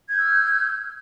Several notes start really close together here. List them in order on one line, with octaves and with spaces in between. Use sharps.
G#6 G6 E6 F6